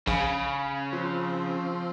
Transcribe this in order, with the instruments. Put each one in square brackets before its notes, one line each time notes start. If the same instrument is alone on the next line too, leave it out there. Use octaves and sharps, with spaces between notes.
[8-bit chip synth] A#1 [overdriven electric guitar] C#3 [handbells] F5 G#5 B5
[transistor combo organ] F3 C4 [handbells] F4